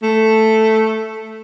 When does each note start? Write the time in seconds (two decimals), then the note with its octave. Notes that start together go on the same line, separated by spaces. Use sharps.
0.03 A3